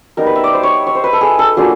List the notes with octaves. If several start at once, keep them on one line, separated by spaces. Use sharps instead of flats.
G3 B3 D#4 A#4
B4
E5
D5
C5
C#5
C#5
C5
B4
A4
G#4
A4
F#3 A#3 D4 F4 G#4